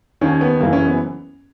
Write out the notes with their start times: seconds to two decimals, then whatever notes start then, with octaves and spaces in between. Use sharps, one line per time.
0.21 D#2 D#3 C#4
0.41 B3
0.60 F#1 F#2 E3 A#3
0.73 C#4
0.85 B3